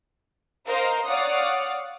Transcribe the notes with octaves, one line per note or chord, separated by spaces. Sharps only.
A#4 C5 D#5 F5
C#5 D5 F5 F#5 D#6